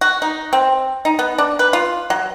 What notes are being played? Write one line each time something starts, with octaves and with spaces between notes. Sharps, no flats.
F#4
D#4
C4
D#4
B3
D4
B4
F4
F#3